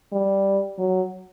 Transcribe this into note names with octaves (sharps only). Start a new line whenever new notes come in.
G3
F#3